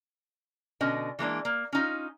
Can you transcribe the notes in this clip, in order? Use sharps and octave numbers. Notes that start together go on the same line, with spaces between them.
B2 D3 C#4 D#5 G#5
E3 G#3 A#3 D4
A#3
C#4 D#4 F4